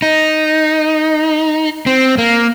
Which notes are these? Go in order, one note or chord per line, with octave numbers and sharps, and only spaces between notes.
D#4
C4
A#3